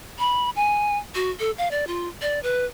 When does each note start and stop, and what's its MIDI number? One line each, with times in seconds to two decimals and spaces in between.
0.19 0.50 83
0.56 0.98 80
1.15 1.30 66
1.40 1.51 69
1.58 1.71 77
1.71 1.87 74
1.87 2.08 65
2.22 2.40 74
2.43 2.65 71